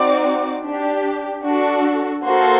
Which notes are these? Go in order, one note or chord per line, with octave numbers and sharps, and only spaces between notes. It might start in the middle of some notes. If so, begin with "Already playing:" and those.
Already playing: C4 D#4 F#4 D5 D6
D4
G4
D4 F#4 A4
A#3 F#4 A4 C5 C6